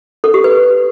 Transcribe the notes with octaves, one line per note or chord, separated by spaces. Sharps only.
A4
G4
B4